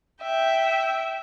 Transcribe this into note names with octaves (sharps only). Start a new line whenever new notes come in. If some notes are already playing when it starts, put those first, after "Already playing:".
E5 G5